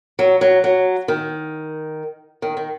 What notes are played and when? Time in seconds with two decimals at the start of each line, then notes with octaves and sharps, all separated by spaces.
0.19 F#3
0.41 F#3
0.64 F#3
1.08 D#3
2.42 D#3
2.57 D#3